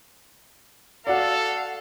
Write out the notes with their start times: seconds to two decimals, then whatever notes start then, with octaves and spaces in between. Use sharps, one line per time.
1.07 F#4 A4 D5 F5 F#5